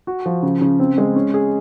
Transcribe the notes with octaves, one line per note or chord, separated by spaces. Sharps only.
F#4
F3
C#3
C#3
C4
G#3
C#4
G#4